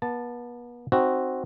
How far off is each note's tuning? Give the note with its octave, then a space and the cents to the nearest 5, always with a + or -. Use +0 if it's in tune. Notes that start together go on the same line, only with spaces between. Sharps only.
B3 -35 A5 +0
C4 +5 D#4 +0 F#4 +0